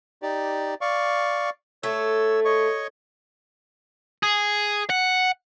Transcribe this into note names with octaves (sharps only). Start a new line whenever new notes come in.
D#4 G4 D5
D5 F5 C#6
A3 C#5 E6
C#5 D#5 C#6
G#4
F#5